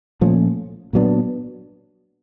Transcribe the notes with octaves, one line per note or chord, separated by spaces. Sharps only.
A#2 F3 A3 C#4
A#2 F#3 B3 D4